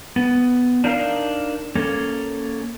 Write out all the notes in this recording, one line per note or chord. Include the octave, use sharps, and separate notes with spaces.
B3
D4 D#4 A#4 F5
A#3 C#4 A4